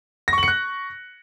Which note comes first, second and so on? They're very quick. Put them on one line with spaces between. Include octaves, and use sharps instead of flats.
A#6 C#6 F#7 C#7 F#6